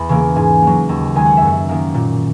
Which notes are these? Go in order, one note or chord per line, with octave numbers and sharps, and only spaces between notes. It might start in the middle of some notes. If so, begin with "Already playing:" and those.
Already playing: E2 B5
C#3 E3 A#3
G#2 G#5
F#3 A#3
D#2
D#3 G#3 G#5
F#5
F#2 E5
F#5
D#3 A#3
A#2